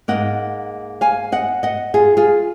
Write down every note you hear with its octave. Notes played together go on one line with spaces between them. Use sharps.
G#2 F3 A#3 D#5 F#5
F5 G#5
D#5 F#5
D#5 F#5
F4 G#4
F4 G#4